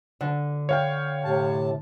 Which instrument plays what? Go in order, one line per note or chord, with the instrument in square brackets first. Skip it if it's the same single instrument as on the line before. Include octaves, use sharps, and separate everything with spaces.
[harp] D3
[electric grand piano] C#5 F5 G5
[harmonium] A2 C3 A5